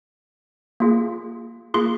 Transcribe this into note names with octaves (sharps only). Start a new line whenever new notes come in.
A#3 F4 G#4
A#3 F4 G#4 C6